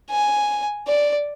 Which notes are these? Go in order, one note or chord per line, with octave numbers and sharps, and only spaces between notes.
G#5
D5